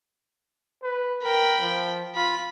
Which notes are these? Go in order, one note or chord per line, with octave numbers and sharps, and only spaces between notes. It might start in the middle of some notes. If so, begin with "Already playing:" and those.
B4
A#4 G5 B5
F3
F4 B5